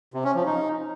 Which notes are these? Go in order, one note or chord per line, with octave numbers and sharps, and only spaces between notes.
C3
C#4
F3
D#4